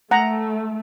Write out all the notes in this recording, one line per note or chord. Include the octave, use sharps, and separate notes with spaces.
A3 F#5 A#5